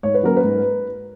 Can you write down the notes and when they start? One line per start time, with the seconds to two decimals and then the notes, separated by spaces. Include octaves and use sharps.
0.03 G#2 C#5
0.14 B4
0.23 F#3 A#3 C#4 A#4
0.37 B4
0.44 G#2